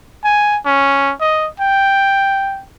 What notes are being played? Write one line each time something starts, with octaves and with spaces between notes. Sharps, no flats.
G#5
C#4
D#5
G5